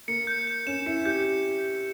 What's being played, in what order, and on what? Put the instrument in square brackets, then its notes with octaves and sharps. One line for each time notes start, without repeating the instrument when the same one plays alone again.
[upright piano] A#3 [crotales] C#7
[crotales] G6
G6
[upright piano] C#4 [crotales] E7
[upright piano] E4 [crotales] C#7
[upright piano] G4 [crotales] G6